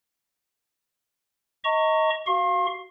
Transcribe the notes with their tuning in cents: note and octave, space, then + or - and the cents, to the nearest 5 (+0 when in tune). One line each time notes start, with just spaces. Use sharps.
D#5 +20 A#5 -35 C#6 +0
F#4 +10 F5 +0 C6 +45